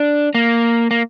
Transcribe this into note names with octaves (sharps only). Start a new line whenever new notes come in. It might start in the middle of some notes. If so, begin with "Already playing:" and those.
Already playing: D4
A#3
A#3